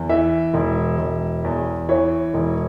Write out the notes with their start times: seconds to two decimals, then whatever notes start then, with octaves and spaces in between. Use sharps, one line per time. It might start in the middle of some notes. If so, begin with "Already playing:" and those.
Already playing: E2
0.09 E3 E5
0.54 E1
0.99 E1
1.44 E2
1.89 E3 C#5
2.34 E1